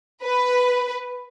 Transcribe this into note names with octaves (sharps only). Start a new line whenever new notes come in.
B4